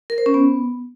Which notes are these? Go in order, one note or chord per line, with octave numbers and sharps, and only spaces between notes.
A#4
C5
C#4
B3